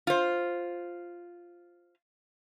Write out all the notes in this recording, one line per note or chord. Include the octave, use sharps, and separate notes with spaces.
F4 C5